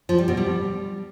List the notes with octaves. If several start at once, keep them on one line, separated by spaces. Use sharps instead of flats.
F3
G3
B2
G3